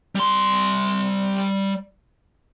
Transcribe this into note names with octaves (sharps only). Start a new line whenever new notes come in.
G3 C6